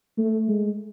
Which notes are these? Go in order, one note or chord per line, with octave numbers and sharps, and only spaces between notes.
A3
G#3